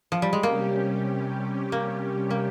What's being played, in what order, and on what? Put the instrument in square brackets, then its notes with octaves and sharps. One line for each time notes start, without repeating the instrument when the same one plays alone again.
[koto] F3
G3
G#3
[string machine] C3 G3 C#4 G4 [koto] A#3
[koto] A#3
A#3